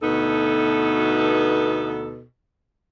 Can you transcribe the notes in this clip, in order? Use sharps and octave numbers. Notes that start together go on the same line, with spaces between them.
D2 B2 B3 D#4 A4